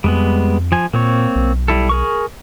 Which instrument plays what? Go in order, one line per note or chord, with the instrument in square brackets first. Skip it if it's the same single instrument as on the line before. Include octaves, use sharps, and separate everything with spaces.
[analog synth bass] F2 [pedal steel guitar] G3 G#3 B3
[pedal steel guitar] F3 G#5
[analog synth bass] A#2 [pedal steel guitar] A#3 C4 C#5
[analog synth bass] B1
[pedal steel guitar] G3 E4 A4
G#4 A#4 C#6